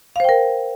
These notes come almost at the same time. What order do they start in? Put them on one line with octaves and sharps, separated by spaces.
F5 C5 G5 A#4